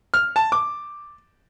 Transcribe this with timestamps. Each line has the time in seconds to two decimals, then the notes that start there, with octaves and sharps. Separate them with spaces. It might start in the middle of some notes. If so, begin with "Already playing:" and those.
0.14 F6
0.36 A5
0.52 D6